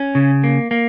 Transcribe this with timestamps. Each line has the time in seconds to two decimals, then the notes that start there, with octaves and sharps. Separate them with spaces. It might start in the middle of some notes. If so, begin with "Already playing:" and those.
Already playing: C#4
0.15 C#3
0.44 A#3
0.71 A#3